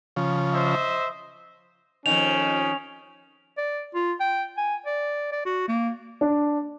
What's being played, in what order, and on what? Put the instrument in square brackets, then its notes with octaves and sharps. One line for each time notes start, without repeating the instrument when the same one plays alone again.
[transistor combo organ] C#3 F3
[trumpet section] C5 D#5 E5
[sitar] F2 D#3 [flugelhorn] C#4 [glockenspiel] F7
[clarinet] D5
F4
G5
G#5
D5
D5
F#4
A#3
[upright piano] D4